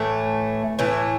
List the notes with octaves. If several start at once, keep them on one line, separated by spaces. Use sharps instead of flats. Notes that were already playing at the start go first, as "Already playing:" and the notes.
Already playing: A2 E3 A3
A2 E3 A3